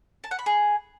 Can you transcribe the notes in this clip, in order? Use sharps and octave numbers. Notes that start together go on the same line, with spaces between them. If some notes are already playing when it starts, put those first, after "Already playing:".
A5
F#5
B5
G#4